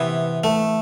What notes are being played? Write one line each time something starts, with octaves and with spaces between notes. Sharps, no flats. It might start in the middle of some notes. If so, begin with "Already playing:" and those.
Already playing: C3 E3 B3 E4
A3